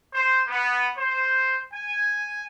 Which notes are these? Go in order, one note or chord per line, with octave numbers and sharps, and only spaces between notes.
C5
B3
C5
G#5